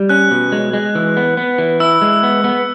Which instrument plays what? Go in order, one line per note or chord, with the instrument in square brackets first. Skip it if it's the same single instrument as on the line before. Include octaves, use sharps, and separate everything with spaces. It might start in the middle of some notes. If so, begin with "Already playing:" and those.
Already playing: [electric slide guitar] G3
[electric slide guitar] C#4 [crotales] F#6
[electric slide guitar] B2
G#3
G#3
E3
B3
B3
E3
[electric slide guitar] E4 [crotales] E6
[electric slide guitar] G#3
B3
B3